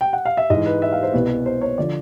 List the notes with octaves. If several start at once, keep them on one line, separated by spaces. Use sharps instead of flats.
G5
F#5
F5
E5
G#2 E3 D#5
B4
E5
F5
C5
C2 B2 B4
C5
C#5
D3 F3 D5